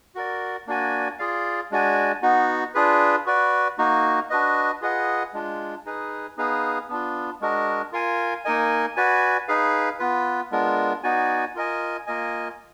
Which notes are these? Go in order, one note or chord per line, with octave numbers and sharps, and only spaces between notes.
F#4 A#4 D5
A#3 D4 F#4 D5 G#5
F4 G#4 D5 F5
G#3 D4 F#4 D5 G#5
B3 D#4 F#4
D4 F4 G#4 B4
F#4 B4 D5
A#3 D#4 F#4
D4 F#4 B4 D#5
F4 G#4 B4 D#5 F#5
G#3 D4 F4
D#4 G#4 B4
B3 D#4 G#4 B4 F5
B3 D4 F4
G#3 D4 F#4 A#4 D#5
F4 A#4 F5 G#5
A#3 D#4 A#4 D#5 G#5
F#4 B4 D5 G#5
D#4 G#4 B4 F5
B3 F4 B4
G#3 B3 D4 F4 A#4
B3 D#4 F#4 D5 G#5
F4 A#4 D#5 G#5
A#3 F4 A#4 D#5 G#5